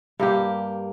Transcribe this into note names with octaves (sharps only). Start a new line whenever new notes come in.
G2 A#3 G4